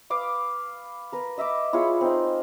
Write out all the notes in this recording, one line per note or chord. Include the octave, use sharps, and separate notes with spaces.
B4 F5 D6 D#6
A#4 B4
D#5 E5 B5 D6
E4 F4 G#4 C#5
C4 D#4